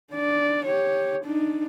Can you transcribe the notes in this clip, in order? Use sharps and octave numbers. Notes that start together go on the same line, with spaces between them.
D4 D5
G4 C#5
D4 D#4